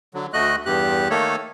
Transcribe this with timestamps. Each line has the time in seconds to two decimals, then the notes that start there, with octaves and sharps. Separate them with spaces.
0.14 D3 F#3
0.33 D2 A3 F#4 D#5 F#6
0.66 E2 G2 G4 F#6
1.10 D#3 A3 A#3 A4 C#5